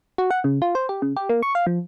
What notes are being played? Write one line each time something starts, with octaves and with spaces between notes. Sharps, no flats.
F#4
F#5
C#3
F4
C5
G4
C#3
G4
A#3
C#6
F5
F3